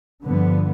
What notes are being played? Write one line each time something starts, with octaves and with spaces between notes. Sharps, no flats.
G2 D3 F3 B3